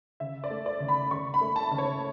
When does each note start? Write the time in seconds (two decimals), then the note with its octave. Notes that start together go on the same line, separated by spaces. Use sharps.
0.20 C#3 E5
0.44 D5
0.50 A3
0.66 D5
0.80 C#3
0.88 B5
1.11 C#3 C#6
1.34 B5
1.41 A3
1.56 A5
1.71 C#3
1.78 C#5